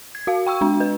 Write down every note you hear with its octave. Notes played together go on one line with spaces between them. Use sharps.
G#6
F#4 F5
G5 C#6 E6
G#3 D4
B4